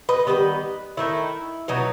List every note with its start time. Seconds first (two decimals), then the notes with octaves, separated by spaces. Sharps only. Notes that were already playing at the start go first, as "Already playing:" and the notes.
0.09 B4 D#5
0.27 D#3 G3 B3 B4 D#5
0.97 D#3 A3 D#4 E4
1.68 B2 F#3 B3 D#4